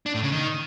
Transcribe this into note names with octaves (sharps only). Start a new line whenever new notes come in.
D4
A2
C#3
D#3